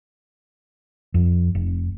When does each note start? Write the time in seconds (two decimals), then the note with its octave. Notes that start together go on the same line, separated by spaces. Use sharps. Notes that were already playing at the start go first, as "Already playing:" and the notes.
1.14 F2
1.55 F1